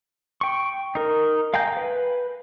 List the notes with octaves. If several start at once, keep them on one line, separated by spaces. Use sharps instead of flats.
G5 C#6
D#4 A#4
F5 G5 G#5 A#5 G6
B4